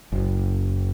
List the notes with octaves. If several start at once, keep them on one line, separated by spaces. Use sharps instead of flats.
F#1